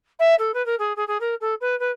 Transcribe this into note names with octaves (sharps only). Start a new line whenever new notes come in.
E5
A4
B4
A#4
G#4
G#4
G#4
A#4
A4
B4
B4